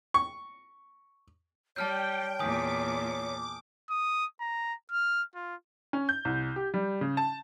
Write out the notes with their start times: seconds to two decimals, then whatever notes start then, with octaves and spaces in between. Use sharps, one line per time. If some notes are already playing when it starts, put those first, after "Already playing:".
0.14 C#6
1.76 G3 C#5 G5 A5 F6 G6
2.39 E2 A#2 G#5 D6 D#6
3.90 D#6
4.40 A#5
4.91 F6
5.35 F4
5.93 C#4
6.09 G6
6.25 C2
6.56 G4
6.74 G3
7.01 C#3
7.17 A5